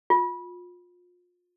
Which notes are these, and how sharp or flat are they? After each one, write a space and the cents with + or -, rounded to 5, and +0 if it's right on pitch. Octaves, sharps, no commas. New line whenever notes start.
F4 +30